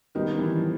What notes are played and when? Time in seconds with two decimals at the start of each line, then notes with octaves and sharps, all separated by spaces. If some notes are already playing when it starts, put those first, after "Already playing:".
0.15 D#3 G3 B3 D#4 G4
0.33 D#3
0.39 E3
0.56 F3